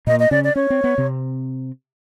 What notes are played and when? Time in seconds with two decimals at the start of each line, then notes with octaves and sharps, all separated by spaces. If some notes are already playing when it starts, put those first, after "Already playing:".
0.07 A#2 A#3 D#5
0.20 D#5
0.31 C#3 C#4 D5
0.44 D5
0.55 C#4 C#5
0.70 C4
0.84 B3
0.98 C3 C4